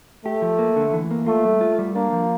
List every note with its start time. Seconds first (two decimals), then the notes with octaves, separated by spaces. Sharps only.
0.25 A3 G4
0.42 F3
0.59 A#3
0.76 D3
0.93 E3
1.11 A#3
1.27 A3 F4
1.45 G3
1.61 F4
1.79 G3
1.94 A#3 D4
2.12 F3